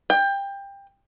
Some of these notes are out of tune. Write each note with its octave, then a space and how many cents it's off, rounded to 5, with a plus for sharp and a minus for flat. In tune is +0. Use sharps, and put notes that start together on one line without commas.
G5 +20